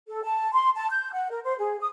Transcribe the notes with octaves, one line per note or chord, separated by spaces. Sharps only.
A4
A5
C6
A5
G6
F#5
A#4
C5
G#4
D#6